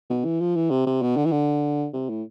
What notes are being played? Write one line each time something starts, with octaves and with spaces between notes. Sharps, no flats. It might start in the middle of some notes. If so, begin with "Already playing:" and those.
B2
E3
F3
E3
C3
C3
B2
D3
E3
D3
C3
A2